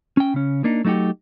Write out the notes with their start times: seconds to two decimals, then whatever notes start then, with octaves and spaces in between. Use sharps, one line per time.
0.17 C#4 G5
0.34 C#3 C#4
0.64 A#3 D4 D#4
0.85 F#3 A3 D#4 F#4 G4